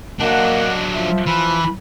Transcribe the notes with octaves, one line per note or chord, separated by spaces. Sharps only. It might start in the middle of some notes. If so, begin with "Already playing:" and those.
F#3 A#3 D4 D#5 F#5
F3 E5
E3 B5